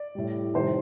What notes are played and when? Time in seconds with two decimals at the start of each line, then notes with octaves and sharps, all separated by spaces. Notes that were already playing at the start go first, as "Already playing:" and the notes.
Already playing: D5
0.15 A2 G3
0.54 C3 D#3 G3 C5